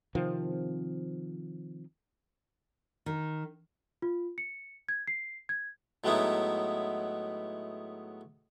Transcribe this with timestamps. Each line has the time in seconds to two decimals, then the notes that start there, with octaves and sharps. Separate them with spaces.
0.15 C3 D#3 F3 C4
3.06 D#3
4.02 F4
4.38 C#7
4.89 G#6
5.08 C7
5.49 G#6
6.04 A2 F#3 G#3 B3 D#4 E4